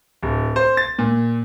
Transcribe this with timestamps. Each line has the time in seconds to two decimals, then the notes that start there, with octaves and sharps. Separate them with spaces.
0.22 D1
0.56 C5
0.77 A6
0.99 A#2